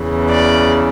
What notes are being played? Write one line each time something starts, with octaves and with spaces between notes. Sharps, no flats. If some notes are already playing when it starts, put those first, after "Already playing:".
Already playing: E2 C#3 E3
D5